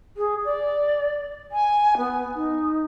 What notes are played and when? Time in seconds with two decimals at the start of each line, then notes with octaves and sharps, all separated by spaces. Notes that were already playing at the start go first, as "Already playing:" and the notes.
0.17 G#4
0.44 D5
1.51 G#5
1.97 B3
2.35 D#4